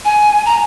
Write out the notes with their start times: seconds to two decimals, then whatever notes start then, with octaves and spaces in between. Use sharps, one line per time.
0.05 G#5
0.46 A#5